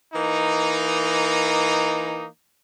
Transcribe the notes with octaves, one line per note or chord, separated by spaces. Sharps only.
E3 A#3 D#4